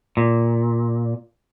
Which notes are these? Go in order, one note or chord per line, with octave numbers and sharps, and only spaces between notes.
A#2